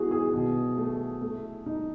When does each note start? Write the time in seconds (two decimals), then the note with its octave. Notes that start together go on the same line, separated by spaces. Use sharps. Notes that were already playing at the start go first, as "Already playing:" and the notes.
Already playing: B3 E4 F#4 G#4
0.11 G#4
0.33 B2
0.78 A3
1.22 A3
1.66 D#4